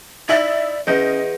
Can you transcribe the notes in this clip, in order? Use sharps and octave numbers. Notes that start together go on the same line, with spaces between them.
D#4 E4 D5 E5 F#7
E2 C#4 D#5 G6 A#6